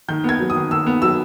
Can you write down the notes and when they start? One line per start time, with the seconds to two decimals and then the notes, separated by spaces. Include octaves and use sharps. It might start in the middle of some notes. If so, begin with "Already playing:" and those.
0.08 D#3 G6
0.24 B3 G#6
0.40 F#3
0.50 D#6
0.55 D#3
0.71 D#3 E6
0.87 B3
1.02 F#3 E6